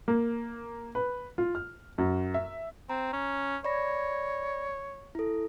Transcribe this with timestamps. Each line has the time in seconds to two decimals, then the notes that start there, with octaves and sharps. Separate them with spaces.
0.08 A#3
0.95 B4
1.38 F4
1.55 F6
1.98 F#2
2.34 E5
2.89 C4 A#5
3.13 C#4
3.64 C#5 D5 B5 A#6
5.15 E4 A4